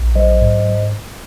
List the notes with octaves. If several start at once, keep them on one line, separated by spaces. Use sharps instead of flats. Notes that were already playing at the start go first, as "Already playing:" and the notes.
Already playing: A#1
F#3 C5 D#5
G#2